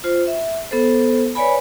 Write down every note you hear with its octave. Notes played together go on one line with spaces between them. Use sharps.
F4 C5
E5
B3 A4 C5
B4 C#5 D5 G#5 B5